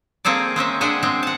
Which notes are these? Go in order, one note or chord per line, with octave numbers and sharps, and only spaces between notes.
A#3 C4 G#4 A4 D5
G#3 C4 C#4 E5
G#3 D4 G#4 C5 E5 F#5
G#3 C4
F#5 A5